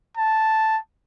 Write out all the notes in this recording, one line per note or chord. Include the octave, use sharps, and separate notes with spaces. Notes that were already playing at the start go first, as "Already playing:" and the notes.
A5